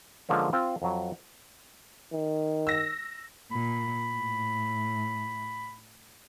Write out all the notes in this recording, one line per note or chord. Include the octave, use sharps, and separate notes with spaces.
D3 F3 G#3 A#3 C#4
C4 F4 C5
F2 F#3
D#3
E6 A#6
A#2 B5
A2